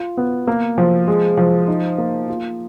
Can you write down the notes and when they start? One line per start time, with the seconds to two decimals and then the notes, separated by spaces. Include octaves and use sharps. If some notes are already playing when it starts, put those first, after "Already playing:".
Already playing: F4
0.17 B3
0.47 A#3
0.78 F3
1.08 G#3
1.37 F3
1.68 D#4
1.98 A#3
2.29 F4